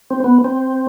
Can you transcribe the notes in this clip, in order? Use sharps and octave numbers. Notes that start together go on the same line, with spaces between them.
C4
B3
C4